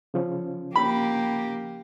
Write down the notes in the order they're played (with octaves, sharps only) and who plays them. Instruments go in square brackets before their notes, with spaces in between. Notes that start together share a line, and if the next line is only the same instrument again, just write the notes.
[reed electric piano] C#3 F3 C#4
[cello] A#3 G4 [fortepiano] B5